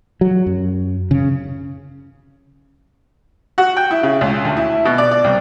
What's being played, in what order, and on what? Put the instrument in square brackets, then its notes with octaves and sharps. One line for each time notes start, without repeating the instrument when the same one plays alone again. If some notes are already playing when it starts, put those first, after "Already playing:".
[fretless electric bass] F#3
F#2
C#3
[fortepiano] F#4
G5
E4
C#3
C#2
D2
E4
B2
D5
D5
C2